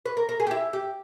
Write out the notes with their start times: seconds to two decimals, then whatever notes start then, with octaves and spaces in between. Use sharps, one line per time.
0.06 B4
0.17 A#4
0.29 A#4
0.40 G#4
0.47 G4
0.51 E4
0.73 G4